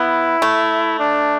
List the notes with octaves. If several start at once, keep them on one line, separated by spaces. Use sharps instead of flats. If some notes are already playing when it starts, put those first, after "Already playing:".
Already playing: B3 E4
A3
D4